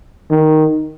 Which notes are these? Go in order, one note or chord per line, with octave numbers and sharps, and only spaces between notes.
D#3